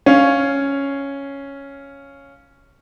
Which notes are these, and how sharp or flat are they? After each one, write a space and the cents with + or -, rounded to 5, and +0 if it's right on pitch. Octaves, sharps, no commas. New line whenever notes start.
C#4 +0 F5 +0